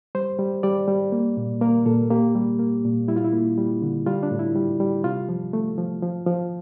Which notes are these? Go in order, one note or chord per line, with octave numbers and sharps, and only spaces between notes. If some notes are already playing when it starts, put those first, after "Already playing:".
G3 C5
G3
G3 D5
G3
A#3
A#2
A#3 A#4
A#2 A4
A#3 G4
G3
A#3
A#2
G3 E4
F4
E4
A#3
G3
D3
G3 F4
D4
A2
E4
G3
G3
C3 F4
F3
A3
F3
F3
F3